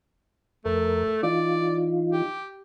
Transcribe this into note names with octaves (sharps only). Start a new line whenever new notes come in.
F2 A3 A#4
E3 D#4 F4 D5
G4